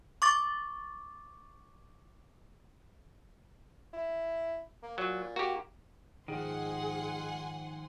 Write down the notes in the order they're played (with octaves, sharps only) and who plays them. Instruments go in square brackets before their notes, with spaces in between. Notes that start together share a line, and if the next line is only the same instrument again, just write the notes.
[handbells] C#6 D6 A6
[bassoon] E4
A#3
[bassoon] A#2 [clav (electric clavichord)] F#3
[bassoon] A#3 [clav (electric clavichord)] F#4 G4
[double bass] G#2 [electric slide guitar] D#3 F3 [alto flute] G#4 [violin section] F#5 G#5 C6